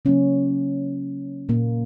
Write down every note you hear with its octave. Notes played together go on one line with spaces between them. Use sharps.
C#3 F#3 A#3 C#4
A#2 A#3